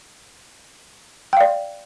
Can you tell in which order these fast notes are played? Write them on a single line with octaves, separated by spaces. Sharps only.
G5 F5 D5